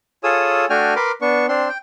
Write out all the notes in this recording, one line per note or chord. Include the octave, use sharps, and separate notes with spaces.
F4 G#4 A4 C#5 D#6 E6
A3 D4 F#4 G5 G#5 F6
A#4 B4 B5 C6 D6
B3 D4 C#6
C4 D4 C6
G5